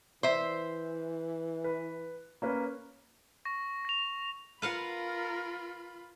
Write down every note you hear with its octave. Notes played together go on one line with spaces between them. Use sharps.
E3 C5 E5
B4
A#3 C#4 B4
C#6 A#6
A#6 F7
F4 A#4 B4 F5 F#5 B5